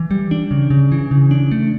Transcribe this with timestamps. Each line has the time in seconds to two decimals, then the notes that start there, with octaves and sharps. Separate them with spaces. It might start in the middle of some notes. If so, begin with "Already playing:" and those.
Already playing: E3
0.11 G3
0.31 D4
0.51 C#3
0.70 C#3
0.92 E3
1.11 C#3
1.31 D4
1.52 A3